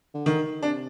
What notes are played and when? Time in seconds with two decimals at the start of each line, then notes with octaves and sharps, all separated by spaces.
0.14 D3
0.26 D#3
0.39 D#3
0.62 C3 D4